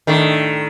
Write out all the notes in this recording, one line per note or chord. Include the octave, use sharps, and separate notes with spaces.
A2 D#3 A3 D4